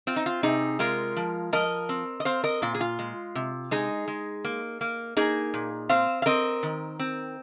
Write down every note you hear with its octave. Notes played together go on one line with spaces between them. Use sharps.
C4 F4
D#4
F4
C3 D#4 G#4
G#3 F4 A#4
F3
F3 A#4 D#5
C4
D#5
C4 C5 F5
A#4 D#5
A#2 F4
G#4
F4
G#3
C3
G#3 D#4 G#4
G#3
A#3
A#3
A#3 D#4 G#4
A#2
C4 C5 F5
F5
C4 A#4 D#5
D#3
C4